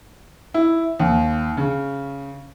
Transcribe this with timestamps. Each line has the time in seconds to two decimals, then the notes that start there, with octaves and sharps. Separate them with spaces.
0.54 E4
1.00 D#2
1.57 C#3